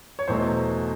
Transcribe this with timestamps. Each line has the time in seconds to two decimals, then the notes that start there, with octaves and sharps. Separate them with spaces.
0.19 C#5
0.28 E2 B2 F#3 A3 C5